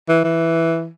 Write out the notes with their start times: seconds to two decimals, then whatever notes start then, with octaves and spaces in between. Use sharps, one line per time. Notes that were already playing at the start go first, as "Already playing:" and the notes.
0.09 E3
0.24 E3